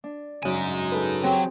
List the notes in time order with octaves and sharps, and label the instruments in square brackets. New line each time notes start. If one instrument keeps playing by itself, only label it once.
[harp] D4
[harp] F#2 C#3 [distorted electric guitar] D#4 G#5
[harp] G#4 A4 B4
[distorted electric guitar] F#3 [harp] C4 G4 G#4 [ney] G5